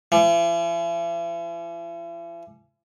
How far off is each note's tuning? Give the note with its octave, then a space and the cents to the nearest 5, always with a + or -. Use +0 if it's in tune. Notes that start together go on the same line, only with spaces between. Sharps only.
E3 +45